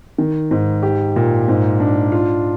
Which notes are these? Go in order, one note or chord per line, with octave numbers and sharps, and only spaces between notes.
D#3
G#2
G4
A#2
G#2
D4
F4